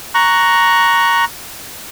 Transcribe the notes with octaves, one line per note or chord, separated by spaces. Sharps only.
A#5 C#6 F#6